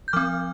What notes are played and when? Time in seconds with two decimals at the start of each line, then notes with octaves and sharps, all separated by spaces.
0.08 G6
0.13 F3 C4 D6 F6